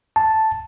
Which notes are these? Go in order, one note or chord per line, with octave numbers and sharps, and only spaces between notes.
A5